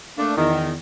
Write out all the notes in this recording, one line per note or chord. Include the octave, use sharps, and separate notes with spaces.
A3 A#3 D4
E2 D#3